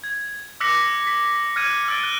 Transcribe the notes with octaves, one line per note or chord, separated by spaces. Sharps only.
G#6
D6 E6 F#6 A#6 B6 C#7
B6
F6 F#6 G#6 C#7 D#7
E6 A6 D7 G7
F#6